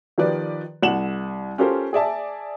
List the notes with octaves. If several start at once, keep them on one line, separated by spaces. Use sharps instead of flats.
D#3 F3 G4 B4 D5
C2 F#5 E7 F#7
C#4 F4 G4 A4 A#4 C5
G#4 D5 E5 A5